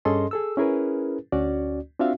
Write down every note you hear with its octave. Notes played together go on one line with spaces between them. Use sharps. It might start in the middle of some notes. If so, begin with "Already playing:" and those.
G2 C#4 G#4 A4 D#5 C6
G#4 A4 E6
C#4 E4 G#4 A#4 B4
D2 C#4 F#4 D5
C4 D4 F4 F#4 E5 F5